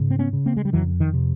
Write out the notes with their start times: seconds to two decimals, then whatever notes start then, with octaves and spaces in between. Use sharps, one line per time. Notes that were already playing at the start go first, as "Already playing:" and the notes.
Already playing: G#2 C#3
0.11 C4
0.19 B3 C#4
0.33 C#3
0.46 A#3 C4
0.57 G#3
0.65 G3
0.73 F2 E3 F#3
1.00 D#3
1.14 C3